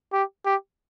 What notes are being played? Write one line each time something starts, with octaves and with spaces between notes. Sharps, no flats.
G4
G4